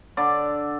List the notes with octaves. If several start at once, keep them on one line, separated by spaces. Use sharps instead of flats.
D3 D5